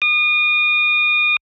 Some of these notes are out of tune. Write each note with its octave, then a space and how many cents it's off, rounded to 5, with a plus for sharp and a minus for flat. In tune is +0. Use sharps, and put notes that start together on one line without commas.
D#6 -35